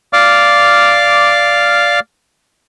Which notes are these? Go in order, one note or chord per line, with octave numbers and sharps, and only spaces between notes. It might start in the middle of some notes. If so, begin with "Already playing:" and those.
D5 F5 D6 F6